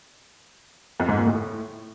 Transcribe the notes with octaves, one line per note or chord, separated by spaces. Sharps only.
F2
G#2
A#2
A2